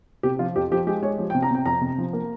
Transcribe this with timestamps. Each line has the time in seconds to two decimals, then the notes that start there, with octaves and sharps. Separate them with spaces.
0.23 C3 G4
0.39 F3 F4
0.56 F2 G4
0.71 F3 G4
0.87 G#3 G4
1.02 G#3 C#5
1.18 F3
1.30 G5
1.35 C3
1.42 A#5
1.51 C3 G5
1.66 F2 A#5
1.81 C3
1.98 F3
2.13 A#3